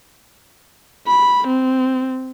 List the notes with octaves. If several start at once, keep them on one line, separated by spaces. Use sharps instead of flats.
B5
C4